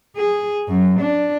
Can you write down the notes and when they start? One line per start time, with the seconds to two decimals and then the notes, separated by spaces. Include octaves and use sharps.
0.16 G#4
0.68 F#2
1.01 D4